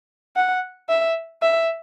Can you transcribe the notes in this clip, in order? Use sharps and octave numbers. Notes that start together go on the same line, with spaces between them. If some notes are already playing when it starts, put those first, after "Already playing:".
F#5
E5
E5